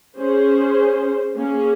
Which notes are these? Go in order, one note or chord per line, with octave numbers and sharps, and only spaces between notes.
C#4 G#4 C5
A#3 C#4 G#4